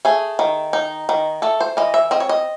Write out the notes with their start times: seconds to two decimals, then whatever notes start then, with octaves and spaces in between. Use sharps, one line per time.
0.05 A3 G#4
0.39 D#3
0.73 D#4
1.09 D#3
1.42 A3 A4
1.61 C5
1.77 E3 D#5
1.94 E5
2.11 C4 D#5
2.20 C#5
2.29 D#5